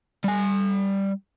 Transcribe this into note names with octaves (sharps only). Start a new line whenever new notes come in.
G3 G#5